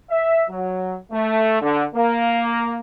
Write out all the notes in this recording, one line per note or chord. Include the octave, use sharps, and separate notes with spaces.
E5
F#3
A3
D3
A#3